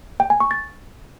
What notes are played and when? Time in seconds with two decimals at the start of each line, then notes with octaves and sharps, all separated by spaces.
0.20 G5
0.30 G#5
0.40 C#6
0.51 A6